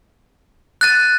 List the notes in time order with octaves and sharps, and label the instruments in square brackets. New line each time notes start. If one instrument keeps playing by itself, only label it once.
[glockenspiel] F#6 A6 D#7